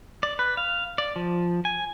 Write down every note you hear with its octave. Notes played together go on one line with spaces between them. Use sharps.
D5
B4
F5
D5
F3
G#5